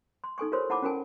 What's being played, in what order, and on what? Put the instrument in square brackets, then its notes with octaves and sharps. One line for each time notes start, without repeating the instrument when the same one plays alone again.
[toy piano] C6
D#4 A4 G#5 C#6
F4 G4 A#4 C5 C#5 C6
E4 F#5 A5 B5 D6
C#4 F#4 A#4 G#5 A5